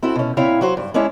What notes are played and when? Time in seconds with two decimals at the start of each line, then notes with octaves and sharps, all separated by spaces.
0.03 C4 E4 F#4 A4
0.16 B2 C#4
0.37 A#2 C4 E4 C#5 E5 F5
0.61 F#3 F#4 C5
0.77 G2
0.94 G#3 C#4 D4 E4 C#5